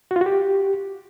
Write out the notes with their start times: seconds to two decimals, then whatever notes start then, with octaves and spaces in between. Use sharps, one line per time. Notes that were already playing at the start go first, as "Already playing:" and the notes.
0.11 F#4
0.16 F4
0.21 F#4
0.26 G4